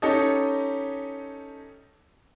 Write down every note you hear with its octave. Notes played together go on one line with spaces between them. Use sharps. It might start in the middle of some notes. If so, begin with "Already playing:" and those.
C#4 D#4 G4 A4 C#5 D#5